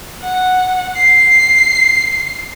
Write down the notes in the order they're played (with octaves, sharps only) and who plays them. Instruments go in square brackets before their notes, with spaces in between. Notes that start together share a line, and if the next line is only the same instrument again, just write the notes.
[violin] F#5
C7